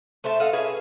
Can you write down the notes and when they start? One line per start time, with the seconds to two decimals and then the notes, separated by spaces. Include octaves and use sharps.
0.24 A3 C5 E5 A5
0.40 A4 D#5 F5 F#5
0.53 C#4 G#4 B4